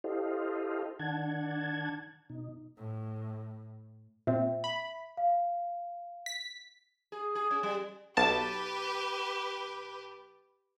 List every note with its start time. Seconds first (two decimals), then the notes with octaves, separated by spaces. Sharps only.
0.04 E4 G4 A4 C5 D#5 F5
0.99 D#3 D4 F#5 A5 G#6
2.30 B2 D#4
2.77 A2
4.27 A#2 C4 E5
4.64 B5
5.17 F5
6.26 B6
7.12 G#4
7.35 G#4
7.51 C#4
7.63 G3
8.17 B1 G4 B4 A5 A6